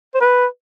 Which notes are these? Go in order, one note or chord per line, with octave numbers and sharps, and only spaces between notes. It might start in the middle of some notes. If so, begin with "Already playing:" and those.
C5
B4